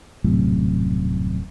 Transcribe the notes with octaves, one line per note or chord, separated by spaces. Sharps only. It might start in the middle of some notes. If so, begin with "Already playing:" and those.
D#1 F#2 A2 C3